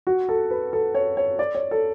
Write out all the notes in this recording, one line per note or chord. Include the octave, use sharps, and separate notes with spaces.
F#4
A4
B4
A4
C#5
C#5
D5
C#5
A4